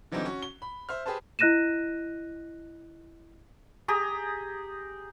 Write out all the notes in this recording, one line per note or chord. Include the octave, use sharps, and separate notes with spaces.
D3 E3 F#3 G3 C4 D#4
C#4 F#4
G7
B5
C5 E5 F6
G4 G#4 B4 C5 A5
E4 D#5 F#6 A#6 D#7 E7
G4 G#4 A#5 D#6